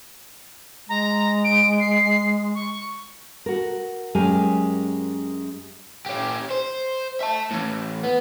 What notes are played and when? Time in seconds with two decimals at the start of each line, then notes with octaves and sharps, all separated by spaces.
0.89 G#3 A#5
1.44 D7
1.80 C7
2.55 C#6
3.46 F#4 A#4
4.15 F#2 G#3 G4 A#4 G#5
6.06 C#4 G4
6.51 C5
7.21 E5 A5
7.51 A2 E3
8.03 B3